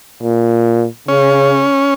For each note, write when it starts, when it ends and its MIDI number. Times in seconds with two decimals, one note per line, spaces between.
0.23 0.86 46
1.08 1.64 49
1.08 1.94 61